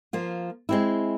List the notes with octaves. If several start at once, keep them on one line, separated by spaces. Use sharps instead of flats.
F3 A#3 F4
G#3 C4 E4